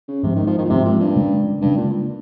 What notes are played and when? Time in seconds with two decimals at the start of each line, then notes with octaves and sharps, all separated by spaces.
0.08 C#3
0.23 G#2 C3 F3 G#3
0.36 D#3
0.47 F3
0.58 D#3
0.65 A#2
0.70 G#2 C3 F3 G#3
0.85 A#2
1.00 G2
1.16 C#3 G#3 C#4
1.61 G2 C#3 G#3 C#4
1.77 A#2